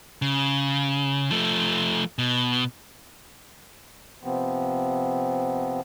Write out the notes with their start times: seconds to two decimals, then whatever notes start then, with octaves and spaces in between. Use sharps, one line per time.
0.22 C#3
1.31 F3 A3
2.19 B2
4.23 C3 F3 B3 C4